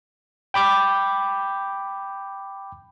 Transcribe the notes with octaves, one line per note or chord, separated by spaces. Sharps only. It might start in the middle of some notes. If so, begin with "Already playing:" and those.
G5 B5 D6 G6